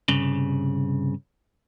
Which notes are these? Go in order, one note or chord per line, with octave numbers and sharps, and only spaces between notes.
C2 G2 C#3